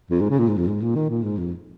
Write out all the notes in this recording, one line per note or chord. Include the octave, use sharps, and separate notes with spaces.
F2
G#2
C#3
A#2
G#2
F2
G#2
A#2
D#3
A#2
G#2
F2